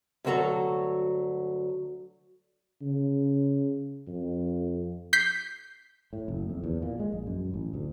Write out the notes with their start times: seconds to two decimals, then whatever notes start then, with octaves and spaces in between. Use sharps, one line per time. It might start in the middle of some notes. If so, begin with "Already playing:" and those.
0.25 D2 G2 F#3 F#4 A4 A#5
2.82 C#3
4.07 F2
5.13 G6 B6 C7
6.13 A2
6.28 F#1
6.50 F2
6.64 E2
6.82 A#2
7.00 G#3
7.12 A#1
7.27 F#2
7.54 A1
7.74 D2